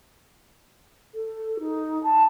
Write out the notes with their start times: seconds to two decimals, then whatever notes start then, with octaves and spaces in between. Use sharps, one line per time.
1.14 A4
1.59 D#4
2.03 A5